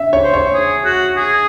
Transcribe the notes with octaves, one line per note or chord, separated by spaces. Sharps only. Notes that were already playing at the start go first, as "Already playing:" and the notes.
Already playing: E5
C#5
C5
C#5
G#4
F#4
G#4